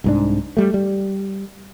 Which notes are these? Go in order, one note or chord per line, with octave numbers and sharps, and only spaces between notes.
C2 G#2 D4
G3 A3
G3